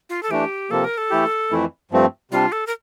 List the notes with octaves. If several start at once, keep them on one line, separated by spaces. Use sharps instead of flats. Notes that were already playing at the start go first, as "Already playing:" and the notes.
F4
A4
E3 A3 D4 G4
C3 F3 A#3 A4
A#4
A4
E3 A3 E4 G4
F2 E3 A3 E4
G2 F3 A3 C4
C3 G3 D4 F4
A4
A#4